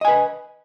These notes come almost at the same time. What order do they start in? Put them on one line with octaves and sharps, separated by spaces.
D#5 G#5 B4